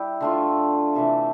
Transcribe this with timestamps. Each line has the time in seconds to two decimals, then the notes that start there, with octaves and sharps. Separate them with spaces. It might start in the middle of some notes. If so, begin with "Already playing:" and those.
Already playing: G3 E4 G4
0.21 D3 A3 D4 F4
0.95 C3 E3 A3 D4